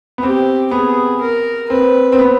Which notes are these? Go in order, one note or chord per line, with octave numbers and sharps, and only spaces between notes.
B3
C4 G4
B3 G#4
A#4
C4 B4
C4
B3